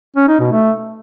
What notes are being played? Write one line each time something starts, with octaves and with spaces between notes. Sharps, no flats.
C#4
D#4
B2
A3